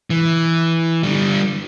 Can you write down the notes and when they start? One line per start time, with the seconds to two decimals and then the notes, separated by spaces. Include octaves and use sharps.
0.10 E3
1.03 D3 G3